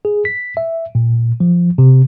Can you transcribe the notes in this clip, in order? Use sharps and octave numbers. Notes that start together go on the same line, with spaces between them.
G#4
B6
E5
A#2
F3
C3